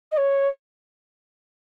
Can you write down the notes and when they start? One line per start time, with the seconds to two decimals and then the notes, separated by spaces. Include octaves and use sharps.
0.12 D#5
0.17 C#5